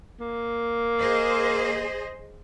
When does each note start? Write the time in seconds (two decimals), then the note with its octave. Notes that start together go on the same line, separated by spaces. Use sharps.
0.20 A#3
1.00 G#4 C5 D#5